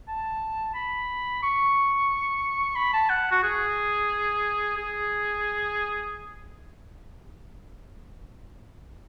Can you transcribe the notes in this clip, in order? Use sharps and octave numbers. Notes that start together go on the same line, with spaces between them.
A5
B5
C#6
B5
A5
F#5
F#4
G#4
G#4